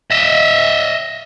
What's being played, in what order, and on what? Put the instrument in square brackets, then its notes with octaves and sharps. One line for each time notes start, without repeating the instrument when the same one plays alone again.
[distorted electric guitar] D#5 E5